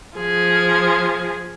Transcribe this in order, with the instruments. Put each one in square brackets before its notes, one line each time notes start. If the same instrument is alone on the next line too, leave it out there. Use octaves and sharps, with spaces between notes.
[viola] F3 G#4